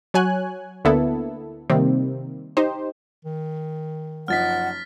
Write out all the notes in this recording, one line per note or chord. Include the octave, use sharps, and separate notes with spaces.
F#3 C#5 G#5 F#6
D2 D3 A#3 B3 E4 A4
C3 D#3 G3 A#3 C4
D#4 G4 C5
D#3
F#1 F3 D#4 F#5 F6 A6 B6